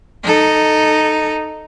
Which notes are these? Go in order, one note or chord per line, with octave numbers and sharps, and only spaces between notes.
D#4 A4